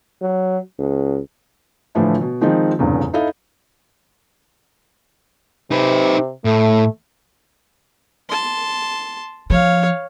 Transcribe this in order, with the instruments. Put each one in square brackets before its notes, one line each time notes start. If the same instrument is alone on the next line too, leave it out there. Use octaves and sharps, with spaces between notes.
[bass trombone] F#3
C#2
[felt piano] A2 D3 E3 F3 A3 E4
B2
D#3 F3 G#3 C4 D#4
F1 A#1 E2 G2 C#3
D#4 E4 A4 D#5 F5
[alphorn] C3 [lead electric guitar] D#4 B4
[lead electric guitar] A2 [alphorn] A3
[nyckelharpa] A5 C6
[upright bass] F3 [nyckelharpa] C#5 F5